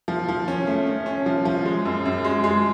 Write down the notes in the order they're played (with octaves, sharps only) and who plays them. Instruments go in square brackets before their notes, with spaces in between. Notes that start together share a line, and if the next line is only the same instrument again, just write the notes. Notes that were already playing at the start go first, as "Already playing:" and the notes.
[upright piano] F3
F3
C#4
A3
C#4
C#4
F3
F3
G#3
F#2
F#2
G#3
G#3